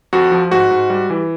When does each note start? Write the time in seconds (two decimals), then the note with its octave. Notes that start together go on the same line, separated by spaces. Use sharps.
0.13 F2 F#4
0.31 F3
0.51 G#2 F#4
0.71 G#2
0.90 G3
1.10 E3